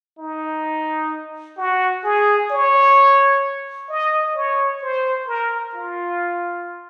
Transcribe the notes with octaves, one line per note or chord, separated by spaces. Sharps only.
D#4
F#4
G#4
C#5
D#5
C#5
C5
A#4
F4